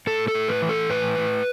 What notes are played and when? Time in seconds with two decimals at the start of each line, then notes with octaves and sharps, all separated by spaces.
0.07 A2 A4
0.28 A4
0.35 A2
0.48 B4
0.62 E3
0.69 A4
0.90 A2 B4
1.18 A2